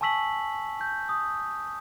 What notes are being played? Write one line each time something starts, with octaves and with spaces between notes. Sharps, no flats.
G#5 A5 C#6 E6 B6 F#7
G6
D#6